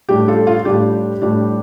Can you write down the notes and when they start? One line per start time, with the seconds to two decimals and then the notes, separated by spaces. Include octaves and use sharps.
0.09 A2 G3 D4 G4
0.28 F4 A4
0.47 F4
0.65 A2 G3 D4 G4
1.22 A2 G3 D4